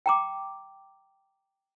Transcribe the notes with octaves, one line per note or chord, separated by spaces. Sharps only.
G5 A#5 D6